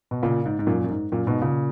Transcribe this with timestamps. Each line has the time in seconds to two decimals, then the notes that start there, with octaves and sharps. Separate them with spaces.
0.11 B2
0.22 A#2 C#3
0.46 G#2
0.59 G#2
0.67 F#2 A#2
0.84 F#2
0.89 G#2
1.12 F#2 A#2
1.27 G#2 B2
1.42 A#2 C#3